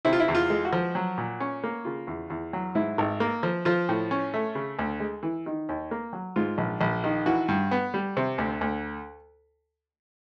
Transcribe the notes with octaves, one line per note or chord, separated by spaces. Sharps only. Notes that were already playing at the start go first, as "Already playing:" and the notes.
C3 E4
F4
E4
E2
F4
G#3
F#4
F3
F#3
A#2
C#4
A#3
C#3 F4
E2
E2
F#3
G#2 E4
G#1
A#3
F3
F3 F4
A2
C#4
A3
C#3
D2
G#3
E3
D#3
D#2
A#3
F#3
G#2 F4
A#1
A#1
D#3
E3 F#4
G2
B3
G3
C3
D2
D2